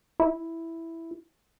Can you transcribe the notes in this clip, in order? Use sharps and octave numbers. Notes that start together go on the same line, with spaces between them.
E4